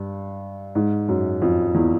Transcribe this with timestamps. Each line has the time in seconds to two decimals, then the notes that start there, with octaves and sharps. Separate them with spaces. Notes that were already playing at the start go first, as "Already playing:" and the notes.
Already playing: G2
0.75 G#2
1.09 F#2
1.41 F2
1.74 E2